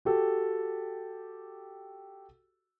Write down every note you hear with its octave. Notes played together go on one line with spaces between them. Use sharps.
F#4 G4 A4